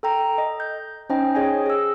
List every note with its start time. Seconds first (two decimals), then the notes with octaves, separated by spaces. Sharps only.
0.03 A4 G5 A#5
0.38 D#5
0.60 G6
1.10 C#4 D#4 C5 D#5 G5
1.35 G#4 C#5 D#5 G5 G#5
1.66 G#4 E6